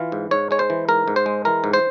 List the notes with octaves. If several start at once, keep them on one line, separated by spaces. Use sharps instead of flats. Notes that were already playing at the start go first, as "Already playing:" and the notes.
Already playing: E3 F4
G#2
G#2 C#5
G#3 C#5
C5
E3
G#2 A#4
G#2
C5
G#3
E3 A#4
G#2
C5